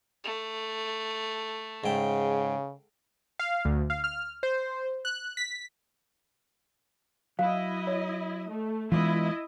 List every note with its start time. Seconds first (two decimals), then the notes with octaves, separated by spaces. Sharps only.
0.24 A3
1.84 G#2 C#3 G5
3.39 F5
3.65 D2
3.90 F5
4.04 F6
4.43 C5
5.05 F#6
5.37 B6
7.39 F#3 E4 D#5 F5
7.87 C#5
8.48 A3
8.92 E3 G3 G#3 B3 D4 E4 F4 D#5